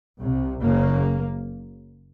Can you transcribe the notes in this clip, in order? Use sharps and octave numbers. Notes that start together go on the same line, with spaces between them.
C2 C3
F#1 F#2 C#3 A#3